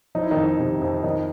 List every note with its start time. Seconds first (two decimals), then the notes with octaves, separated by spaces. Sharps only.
0.15 F3 D#4
0.23 E4
0.31 D#3 D#4
0.37 F2
0.60 C3
0.82 F2
1.04 D#3 F3 D#4